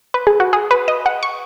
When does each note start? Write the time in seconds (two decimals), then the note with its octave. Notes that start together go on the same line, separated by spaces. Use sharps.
0.14 B4
0.27 G#4
0.40 F#4
0.53 G#4
0.71 B4
0.88 D#5
1.06 F#5
1.23 C#6